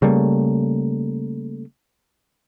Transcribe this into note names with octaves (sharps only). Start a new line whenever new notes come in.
C#3 G3 A3 A#3